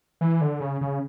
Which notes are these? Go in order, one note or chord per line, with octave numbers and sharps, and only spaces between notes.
E3
D3
C#3
C#3